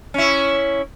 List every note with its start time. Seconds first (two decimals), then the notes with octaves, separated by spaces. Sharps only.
0.14 C#4 E4